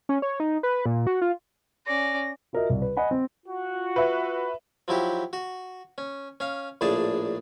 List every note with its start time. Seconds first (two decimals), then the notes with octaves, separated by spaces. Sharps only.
0.09 C#4
0.22 C#5
0.40 D#4
0.63 B4
0.86 A#2
1.07 F#4
1.22 F4
1.87 C#4 D5 A#6
2.53 F4 F#4 A#4 D#5 E5
2.70 C2
2.82 B4
2.97 D#5 F#5 G#5 B5
3.11 C4
3.46 F4 F#4
3.96 B4 E5
4.88 F3 F#3 E4 G4
5.33 F#4
5.98 C#4
6.40 C#4 F5
6.81 A#1 A2 D4 G#4 A5